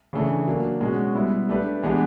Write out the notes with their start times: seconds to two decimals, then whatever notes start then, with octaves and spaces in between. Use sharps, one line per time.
0.13 C#3 E3 A3 D4
0.47 F#3 A#3 D4
0.81 B2 G#3 C#4 F#4
1.15 G3 B3 E4
1.49 A3 D4 G4 B4
1.83 E3 G#3 B3 D4 G4